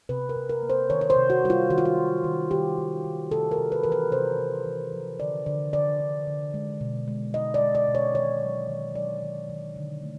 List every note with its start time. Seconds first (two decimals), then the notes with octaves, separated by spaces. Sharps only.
0.09 C3 B4
0.29 A#4
0.36 C3
0.49 A#4
0.63 A#3
0.70 C5
0.90 D#3 C#5
1.01 C#5
1.10 C5
1.16 C3
1.30 F#4
1.44 G3 F#4
1.50 F4
1.70 D#3 F#4
1.78 F4
1.85 F#4
1.97 D#3
2.24 D#3
2.51 D#3 G4
2.78 D#3
3.04 D#3
3.31 C3 A4
3.51 A#4
3.58 C3
3.72 B4
3.83 E3 A#4
3.92 B4
4.12 C3 C5
4.39 C3
4.66 E3
4.93 F3
5.19 D3 D5
5.46 D3 D5
5.73 D3 D5
6.00 D3
6.27 D3
6.54 G#3
6.81 B2
7.08 G#3
7.34 G#3 D#5
7.54 D5
7.61 G#3
7.75 D5
7.88 B2
7.95 C#5
8.15 D#3 C#5
8.42 F#3
8.69 D#3
8.95 F#3 D5
9.23 D#3
9.49 D#3
9.76 D3
10.03 A3